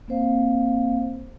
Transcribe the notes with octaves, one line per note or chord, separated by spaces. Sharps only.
A#3 C4 C5 F5